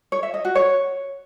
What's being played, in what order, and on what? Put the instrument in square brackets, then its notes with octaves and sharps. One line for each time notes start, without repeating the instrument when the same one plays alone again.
[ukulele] C#5
E5
D#5
F#4
C#5